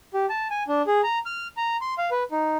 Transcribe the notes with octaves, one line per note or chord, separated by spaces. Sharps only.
G4
A5
G#5
D4
G#4
A#5
F6
A#5
C6
F5
B4
D#4